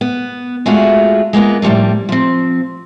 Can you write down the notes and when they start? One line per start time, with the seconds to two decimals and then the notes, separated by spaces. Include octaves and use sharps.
0.01 B3
0.66 G#3 A3 D4 F4 F#4
1.33 G#3 A#3 B3 F4
1.62 A2 F3 G3 A3 A#3
2.09 F3 C4